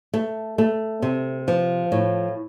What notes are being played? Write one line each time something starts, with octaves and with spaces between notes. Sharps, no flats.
A3
A3
C3
F3
A2